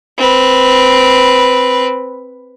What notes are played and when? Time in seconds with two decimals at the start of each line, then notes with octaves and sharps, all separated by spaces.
0.18 C4 B4